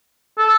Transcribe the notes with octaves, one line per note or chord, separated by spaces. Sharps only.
A4